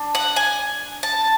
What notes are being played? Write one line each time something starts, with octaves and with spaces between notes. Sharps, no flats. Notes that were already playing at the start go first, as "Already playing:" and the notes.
Already playing: D4
F#5
G#5
A5